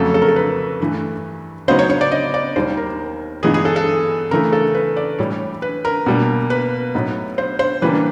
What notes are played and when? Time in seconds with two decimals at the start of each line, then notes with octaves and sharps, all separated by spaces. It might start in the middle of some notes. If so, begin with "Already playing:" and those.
Already playing: F2 C#3 F#3 A3 C#4 A4
0.14 A4
0.22 A#4
0.29 A4
0.36 B4
0.80 G2 E3 A3
1.68 C#3 F#3 B3 D#4 C5
1.79 C#5
1.90 C#5
2.01 D5
2.11 D#5
2.34 D5
2.56 D#2 D#3 G3 C5
2.77 A#4
3.43 G2 E3 G#3 B3 D#4 G#4
3.54 G#4
3.65 A4
3.76 A4
4.31 C#3 E3 A3 A#4
4.52 A4
4.75 B4
4.97 D5
5.18 A2 E3 G3 C#5
5.62 B4
5.85 A#4
6.06 B2 G3 A#3
6.50 B4
6.95 A2 F#3 B3 D#4
7.38 C5
7.59 C5
7.82 C#3 E3 G3 A#3 D4 B4